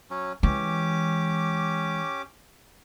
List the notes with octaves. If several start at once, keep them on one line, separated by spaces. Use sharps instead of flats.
F#3 C#4
E3 G#3 C#4 G4 D6